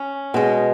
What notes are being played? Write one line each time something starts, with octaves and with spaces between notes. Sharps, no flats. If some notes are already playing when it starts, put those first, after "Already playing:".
Already playing: C#4
B2 G#3